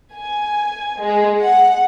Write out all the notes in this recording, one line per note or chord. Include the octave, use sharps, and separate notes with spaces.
G#5
G#3
F#5